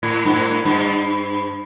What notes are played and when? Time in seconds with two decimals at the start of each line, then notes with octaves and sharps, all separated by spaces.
0.03 A2
0.25 G2
0.34 A2
0.65 G2